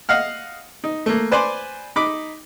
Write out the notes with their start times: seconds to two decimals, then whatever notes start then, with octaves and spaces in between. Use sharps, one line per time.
0.09 D#5 F5 F#5 F6
0.84 D#4
1.06 A3 A#3
1.31 B4 C5 D5 G#5 C6 D6
1.96 D#4 B5 D6